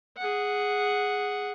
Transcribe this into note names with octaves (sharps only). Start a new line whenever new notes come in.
G#4 F#5